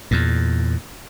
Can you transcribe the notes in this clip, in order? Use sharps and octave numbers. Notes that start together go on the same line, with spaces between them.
E2 A#2